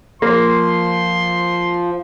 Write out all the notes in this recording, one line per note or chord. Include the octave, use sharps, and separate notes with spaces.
F3 A#3 C6